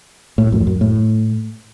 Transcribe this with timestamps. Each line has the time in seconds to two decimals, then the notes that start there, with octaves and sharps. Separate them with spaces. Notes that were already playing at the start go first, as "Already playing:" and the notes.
0.38 A2
0.52 F#2
0.60 F2
0.67 F#2
0.81 A2